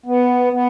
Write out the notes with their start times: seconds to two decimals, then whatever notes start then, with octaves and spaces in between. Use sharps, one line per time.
0.06 B3
0.53 B3